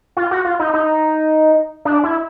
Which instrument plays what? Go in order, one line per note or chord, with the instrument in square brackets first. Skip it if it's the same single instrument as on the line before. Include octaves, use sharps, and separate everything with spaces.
[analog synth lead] F4
F#4
F4
D#4
D#4
D4
E4